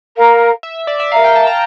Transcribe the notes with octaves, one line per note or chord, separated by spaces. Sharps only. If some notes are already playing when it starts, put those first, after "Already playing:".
A#4 F5 A#5
E5
D5
E5
A#4 E5 F5 A#5
G5
A5
A#5